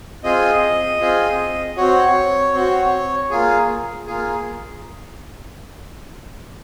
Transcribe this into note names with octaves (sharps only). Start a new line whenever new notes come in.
C4 F4 G#4 D#5
C4 F4 G#4
C4 F#4 C#5
C4 F#4
A#3 F4 G#4
A#3 F4 G#4